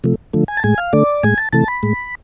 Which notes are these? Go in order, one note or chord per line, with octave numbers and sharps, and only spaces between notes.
C3 F3 A3
D3 F3 A3
G#5
A5
A2 G#3 G#5
F5
D3 A3 D5
A2 G#3 G#5
A5
C3 E3 A3 A5
B5
A2 G#3